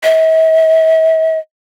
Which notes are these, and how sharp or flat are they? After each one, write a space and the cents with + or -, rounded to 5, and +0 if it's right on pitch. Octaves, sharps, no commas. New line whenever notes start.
E5 -45